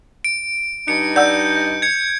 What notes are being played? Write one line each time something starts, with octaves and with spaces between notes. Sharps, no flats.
D7
G2 D#4 C#7
D5 F#5 E6 G6
G#6 C#7